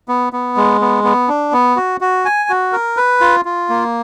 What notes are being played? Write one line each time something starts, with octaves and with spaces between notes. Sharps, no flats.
B3
B3
G#3
B3
B3
D4
B3
F#4
F#4
G#5
F#4
A#4
B4
F4
F4
A#3